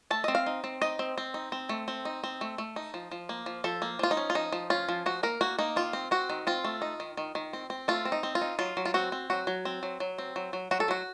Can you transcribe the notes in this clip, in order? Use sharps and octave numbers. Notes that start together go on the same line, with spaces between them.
A3 A5
C4 D#5
F5
D#4
C4
D#4 D#5
C4
C4
D#4
C4
A3
C4
D#4
C4
A3
A3
D#4
F3
F3
A#3
F3
F3 A4
A#3
F3 F4
D#4
C#4
F4
F3 D#4
F3
C#4 F4
F3
F3 F#4
A#3 A#4
A#3 F#4
A#3 D#4
D#3 F4
C4
C4 F#4
D#3
C4 F4
A3
D#4
D#3
D#3
D#3
C4
C4
A3 F4
C4
D#4
C4
F4
D#4
F#3 F4
F#3
F4
C4 F#4
C4
F#3 F#4
F#3
C4
F#3
F#3
C4
F#3
F#3
F#3 F#4
A4
F#3 F#4